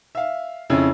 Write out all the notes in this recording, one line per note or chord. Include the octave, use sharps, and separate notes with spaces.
E5 F5
F2 C#3 C#4 E4